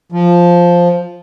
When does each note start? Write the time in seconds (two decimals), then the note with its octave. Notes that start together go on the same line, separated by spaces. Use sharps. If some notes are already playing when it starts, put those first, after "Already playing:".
0.12 F3